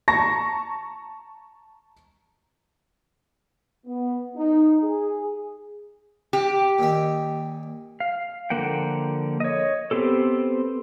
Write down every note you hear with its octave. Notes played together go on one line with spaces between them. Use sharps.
A5 A#5 C#6 A#6
B3
D#4
G#4
G4
A#2 D#3 E5
F5
D3 F3 A#3 F#5 G5
C#5 D#5
B3 C4 G4 A4